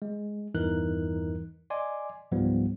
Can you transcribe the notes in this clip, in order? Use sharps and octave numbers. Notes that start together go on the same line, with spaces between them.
G#3
E2 G2 E3 D#4 A#4 F#6
D5 D#5 G#5 C6 D6
C#2 G#2 F3 G3 B3